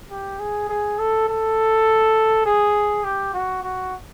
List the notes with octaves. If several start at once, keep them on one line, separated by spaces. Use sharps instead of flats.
G4
G#4
G#4
A4
A4
G#4
G4
F#4
F#4